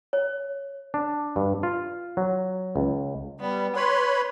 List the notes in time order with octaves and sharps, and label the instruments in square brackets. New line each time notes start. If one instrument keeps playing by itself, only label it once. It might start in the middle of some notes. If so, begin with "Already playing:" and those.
[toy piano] C#5
[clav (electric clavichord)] D4
G2
F4
F#3
C#2
[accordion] G3 [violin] B3
[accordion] B4 C#5 B5 [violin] C6